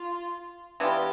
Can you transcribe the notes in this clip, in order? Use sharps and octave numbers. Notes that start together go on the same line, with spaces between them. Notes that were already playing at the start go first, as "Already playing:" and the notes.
Already playing: F4
E3 B3 D4 F4 G4